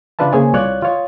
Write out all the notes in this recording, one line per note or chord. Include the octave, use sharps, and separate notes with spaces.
C#3 D4 F4 B4 E5 A5
C#3 A#3 G#4 C5 C#5 G#5
C2 F4 C#5 D5 F#6
F4 C#5 D#5